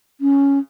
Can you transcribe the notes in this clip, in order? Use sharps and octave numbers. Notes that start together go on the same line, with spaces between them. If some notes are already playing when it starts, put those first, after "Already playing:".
C#4